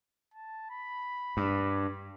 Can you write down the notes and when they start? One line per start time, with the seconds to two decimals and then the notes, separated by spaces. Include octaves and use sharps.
0.34 A5
0.71 B5
1.37 G2